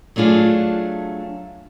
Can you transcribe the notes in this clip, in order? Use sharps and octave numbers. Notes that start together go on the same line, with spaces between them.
F#3 A3 D4 F4 G#4